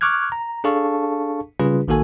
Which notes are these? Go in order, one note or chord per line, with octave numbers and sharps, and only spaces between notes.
C#6 D6 F6 F#6 G#6
A#5
D4 G#4 A4 F5 A5 C#6
C#3 G3 C#4 F4 G#4 B4
A#1 D#3 A#3 F#4 A4 G#5